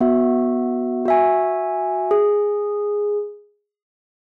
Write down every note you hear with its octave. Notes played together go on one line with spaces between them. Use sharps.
B3 F#4 E5
F#4 E5 G#5
G#4